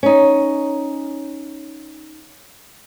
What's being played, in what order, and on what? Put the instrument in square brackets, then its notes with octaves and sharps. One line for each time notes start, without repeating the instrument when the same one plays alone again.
[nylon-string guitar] C#4 D#4